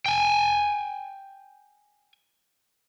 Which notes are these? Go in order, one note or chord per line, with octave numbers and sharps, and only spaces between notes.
G5 G#5